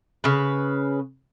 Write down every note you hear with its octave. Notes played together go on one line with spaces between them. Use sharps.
C#3 B4